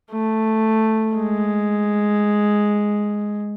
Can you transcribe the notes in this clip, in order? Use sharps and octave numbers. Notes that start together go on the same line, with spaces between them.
A3
G#3